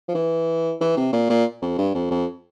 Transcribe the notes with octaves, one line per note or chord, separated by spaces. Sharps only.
F3
E3
E3
C3
A#2
A#2
F2
G2
F2
F2